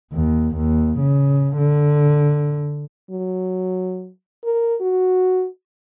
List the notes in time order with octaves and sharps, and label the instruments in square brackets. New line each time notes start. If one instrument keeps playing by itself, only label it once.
[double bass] D#2
D#2
C#3
D3
[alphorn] F#3
A#4
F#4